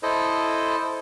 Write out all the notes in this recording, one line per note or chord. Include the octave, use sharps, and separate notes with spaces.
E4 A4 C5 D#5